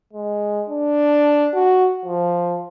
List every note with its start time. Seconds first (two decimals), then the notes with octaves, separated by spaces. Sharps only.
0.13 G#3
0.69 D4
1.54 F#4
2.05 F3